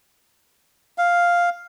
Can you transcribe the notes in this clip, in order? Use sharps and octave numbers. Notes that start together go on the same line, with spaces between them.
F5